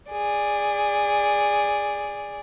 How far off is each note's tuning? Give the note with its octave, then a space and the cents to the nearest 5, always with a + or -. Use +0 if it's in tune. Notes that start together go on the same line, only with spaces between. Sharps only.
G#4 -15 D5 +0